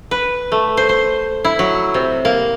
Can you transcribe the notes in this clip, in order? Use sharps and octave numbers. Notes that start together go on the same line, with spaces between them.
B4
A3
C5
C5
E4
F#3
C3
A#3